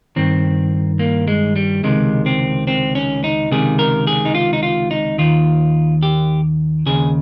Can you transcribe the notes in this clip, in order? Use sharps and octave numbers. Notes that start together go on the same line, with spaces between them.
G2 D#3 C4
A#3
G#3
G3
C#2 C3 D#3 G#3
C4
C4
C#4
D#4
C#2 C3 D#3 G#4
A#4
G#4
D#4
F4
D#4
F4
D#4
D#2 D#3 F4
G4
D#2 C#3 G#4